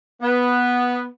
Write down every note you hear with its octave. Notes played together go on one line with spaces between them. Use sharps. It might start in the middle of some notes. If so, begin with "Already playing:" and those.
B3